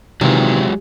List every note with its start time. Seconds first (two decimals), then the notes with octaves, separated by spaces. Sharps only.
0.21 C3 D#3 E3 F#3 G#3 F4